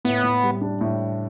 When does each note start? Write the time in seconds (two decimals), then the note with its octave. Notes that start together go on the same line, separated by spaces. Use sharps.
0.05 A2 B3
0.24 A2
0.43 G3
0.61 D4
0.81 A2